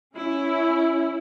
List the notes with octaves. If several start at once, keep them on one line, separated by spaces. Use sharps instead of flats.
C#4 E4